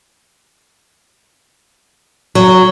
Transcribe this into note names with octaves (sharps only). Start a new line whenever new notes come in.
F#3